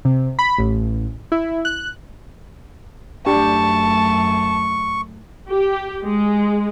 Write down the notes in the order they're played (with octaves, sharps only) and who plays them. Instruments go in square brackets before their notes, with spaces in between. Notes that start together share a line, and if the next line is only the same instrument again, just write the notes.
[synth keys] C3
B5
A1
E4
F#6
[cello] F#2 A3 [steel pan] D4 G4 [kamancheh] A5 [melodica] C#6
[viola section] G4
G#3